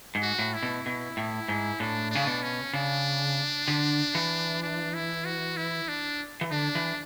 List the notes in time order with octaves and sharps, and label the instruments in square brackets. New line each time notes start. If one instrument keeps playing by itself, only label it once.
[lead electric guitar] G#2
[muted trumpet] F#4
[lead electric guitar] A2
[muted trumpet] E4
[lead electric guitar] B2
B2
A2
G#2
[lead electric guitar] A2 [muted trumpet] D4
[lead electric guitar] C#3 [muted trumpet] D4
[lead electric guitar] B2
[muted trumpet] C#4
[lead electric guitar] C#3 [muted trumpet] D4
[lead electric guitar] D3
E3
[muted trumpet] D4
E4
F#4
E4
D4
[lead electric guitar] E3
[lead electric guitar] D3 [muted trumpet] D4
[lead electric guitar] E3